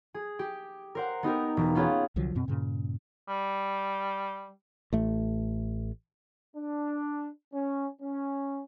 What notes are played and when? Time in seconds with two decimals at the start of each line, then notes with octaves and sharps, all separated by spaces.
0.14 G#4
0.39 G4
0.95 A#4 C5 F#5
1.23 B3 D#4 G4 A#4
1.57 E1
1.75 B3 C#4 F4 G4 G#4
2.16 C2 D3 F3 F#3
2.35 F#2 B2 C4
2.48 G2 A#2 C#3
3.29 G3
4.93 A1 A3
6.56 D4
7.53 C#4
8.01 C#4